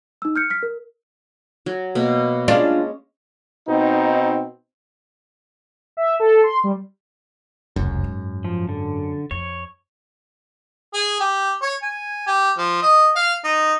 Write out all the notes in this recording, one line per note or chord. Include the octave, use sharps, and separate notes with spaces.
D#4 E6
F6 G6 C#7
F6 B6
A#4
F#3
B2 A#3
G#3 C#4 D4 F4
B2 C4 D#4
E5
A4
C6
G3
F1 C#2 F#2
G#2
F3
D3
F2 C#5
G#4
G4
C#5
G#5
G4
F3
D#5
F5
D#4